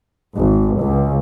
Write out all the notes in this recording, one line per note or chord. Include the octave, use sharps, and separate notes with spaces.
G#1
C#2